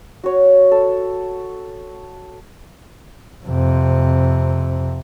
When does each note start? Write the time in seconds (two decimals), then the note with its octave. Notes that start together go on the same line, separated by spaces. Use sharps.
0.24 F#4 C#5
0.72 A4
3.45 F2 C3